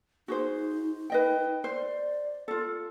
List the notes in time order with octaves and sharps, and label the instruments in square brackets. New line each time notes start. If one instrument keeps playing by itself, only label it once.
[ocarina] D#4 [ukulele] F#4 G#4 C5
[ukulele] B4 D#5 G5
[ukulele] C5 [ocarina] D5
[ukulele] F4 A4